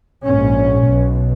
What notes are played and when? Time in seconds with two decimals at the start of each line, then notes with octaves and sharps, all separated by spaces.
0.24 A#1 G#2 C#4
0.88 B1 B2